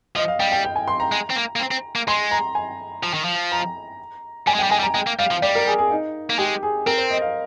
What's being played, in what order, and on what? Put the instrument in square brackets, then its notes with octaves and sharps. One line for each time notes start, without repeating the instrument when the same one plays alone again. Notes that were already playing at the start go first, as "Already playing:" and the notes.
[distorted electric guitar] F3 [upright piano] D#5
[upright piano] F5
[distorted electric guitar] G3 [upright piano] G5
[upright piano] G5
G5
G#5
C6
A#5
[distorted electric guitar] G#3
C4
A#3
A#3
C4
C4
A#3
[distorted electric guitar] G#3 [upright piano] C6
[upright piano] A#5
G#5
[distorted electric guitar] F3
D#3
F3
[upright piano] A#5
[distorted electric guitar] G3 [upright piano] G#5
[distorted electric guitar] G#3
[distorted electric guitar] G3 [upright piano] G5
[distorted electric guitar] G#3 [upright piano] G#5
[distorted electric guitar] G3
[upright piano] A#5
[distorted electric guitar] G#3 [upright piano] G5
[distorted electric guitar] A#3
[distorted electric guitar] G3 [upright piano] F5
[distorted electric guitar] F3
[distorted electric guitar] G3 [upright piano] D5
[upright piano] A#4
G#4
G#4
D#4
[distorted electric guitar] A#3
[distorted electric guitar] G#3 [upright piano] G4
[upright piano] G#4
[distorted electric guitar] C4 [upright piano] A#4
[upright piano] C5
D#5
F5